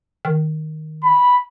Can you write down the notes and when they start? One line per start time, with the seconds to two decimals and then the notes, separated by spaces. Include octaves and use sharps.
0.25 D#3
1.03 B5